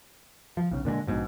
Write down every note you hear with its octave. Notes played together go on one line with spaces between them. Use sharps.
F3
B1 C#3
A#2 D3 F#3 G#3
A#1 G#2 B2